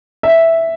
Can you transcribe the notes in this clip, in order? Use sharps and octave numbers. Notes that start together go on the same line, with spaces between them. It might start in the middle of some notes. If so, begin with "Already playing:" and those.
E5